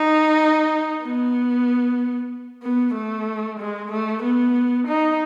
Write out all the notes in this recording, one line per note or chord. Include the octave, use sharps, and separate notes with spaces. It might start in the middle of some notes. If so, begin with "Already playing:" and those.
Already playing: D#4
B3
B3
A3
G#3
A3
B3
D#4